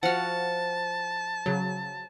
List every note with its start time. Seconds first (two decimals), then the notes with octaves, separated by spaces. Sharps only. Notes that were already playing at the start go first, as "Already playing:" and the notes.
0.03 F3 F#4 F#5 A5 F6
1.46 C#3 F#3